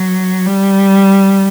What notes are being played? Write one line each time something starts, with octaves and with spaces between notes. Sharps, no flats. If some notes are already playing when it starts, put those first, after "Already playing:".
Already playing: F#3
G3